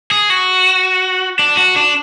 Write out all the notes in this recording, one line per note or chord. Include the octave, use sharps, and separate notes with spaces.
G#4
F#4
D4
F#4
D4